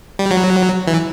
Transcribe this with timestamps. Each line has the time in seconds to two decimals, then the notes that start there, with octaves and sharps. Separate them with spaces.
0.19 G3
0.31 F#3
0.87 E3